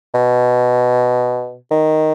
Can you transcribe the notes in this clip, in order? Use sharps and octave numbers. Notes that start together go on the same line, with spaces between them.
B2
D#3